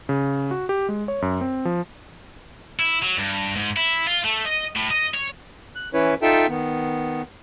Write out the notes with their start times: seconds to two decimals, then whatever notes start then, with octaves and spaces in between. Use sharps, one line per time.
0.09 C#3
0.51 F#4
0.69 G4
0.89 G#3
1.08 C#5
1.22 F#2
1.41 C4
1.65 F3
2.79 E4
3.02 F#3
3.17 G2
3.56 G#2
3.77 E4
4.07 F4
4.24 A3
4.45 D#5
4.76 A2
4.90 D#5
5.14 C#5
5.75 F#6
5.94 E3 C#4 E4 B4 C#5
6.22 D#4 F4 A4 E5 G5 A5
6.49 D#3 B3